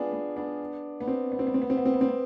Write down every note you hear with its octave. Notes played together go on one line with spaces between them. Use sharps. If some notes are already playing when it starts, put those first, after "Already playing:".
Already playing: B3 D4 F4 G#4
B3
B3 D4
B3
C4
B3
C4
B3
C4
B3
C4
B3
C4
B3
C4
B3